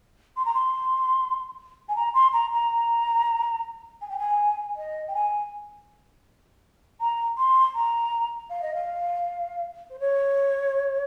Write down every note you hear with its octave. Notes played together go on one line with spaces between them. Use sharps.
C6
A#5
C6
G#5
A#5
C6
A#5
A#5
G#5
G5
G#5
D#5
G5
G#5
A#5
C6
A#5
F5
D#5
F5
C5
C#5